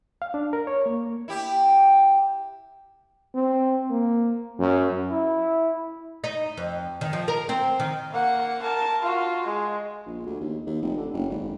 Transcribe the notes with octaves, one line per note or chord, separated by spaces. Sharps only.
F5
D4
A#4
C#5
A#3
E4 G4
C4
A#3
F#2
E4
D#4
F2
D#3
F3
A#4
C4
D#3
A#3 F#5
A#4 A5
F4 F#4
G#3
A#1
D2
D#2
D#2
F1
D3
F#1
G#1